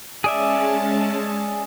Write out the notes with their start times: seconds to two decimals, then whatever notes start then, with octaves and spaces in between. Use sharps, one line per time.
0.24 G#3 C#4 G#4 D5 E5 A5